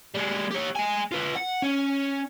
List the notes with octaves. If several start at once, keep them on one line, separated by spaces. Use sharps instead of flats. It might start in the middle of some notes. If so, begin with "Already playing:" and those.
G3 G#3
G4 C#5
G#3 G#5
F4 B4
F#5
C#4